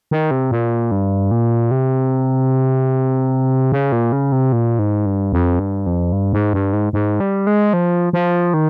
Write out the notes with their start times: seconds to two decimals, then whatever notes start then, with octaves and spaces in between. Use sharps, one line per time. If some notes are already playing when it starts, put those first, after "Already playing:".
0.11 D#3
0.31 C3
0.51 A#2
0.91 G2
1.31 A#2
1.71 C3
3.72 C#3
3.92 A#2
4.12 C#3
4.32 C3
4.53 A#2
4.79 G#2
5.06 G2
5.33 F2
5.60 G2
5.86 F2
6.13 G2
6.33 G#2
6.53 G2
6.73 G#2
6.93 G#2
7.20 G3
7.47 G#3
7.73 F3
8.13 F3
8.54 D#3